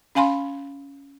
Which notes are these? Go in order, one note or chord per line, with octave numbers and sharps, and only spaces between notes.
C#4 F5 G#5 B5 C6